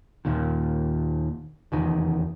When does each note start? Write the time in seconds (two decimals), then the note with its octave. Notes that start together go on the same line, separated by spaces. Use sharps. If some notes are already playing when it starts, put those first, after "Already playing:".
0.25 D#2 A#2 D#3
1.72 F1 E2 D#3